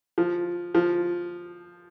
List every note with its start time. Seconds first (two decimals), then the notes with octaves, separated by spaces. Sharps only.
0.18 F3
0.75 F3